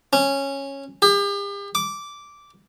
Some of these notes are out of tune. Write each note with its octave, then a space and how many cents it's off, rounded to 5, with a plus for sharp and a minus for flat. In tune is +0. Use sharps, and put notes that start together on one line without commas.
C#4 -10
G4 +40
D6 -10